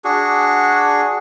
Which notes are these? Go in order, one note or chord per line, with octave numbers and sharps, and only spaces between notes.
D4 F#4 G#4